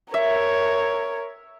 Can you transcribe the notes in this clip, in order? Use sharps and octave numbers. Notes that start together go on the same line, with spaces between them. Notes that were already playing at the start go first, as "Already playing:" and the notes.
A#4 C#5 E5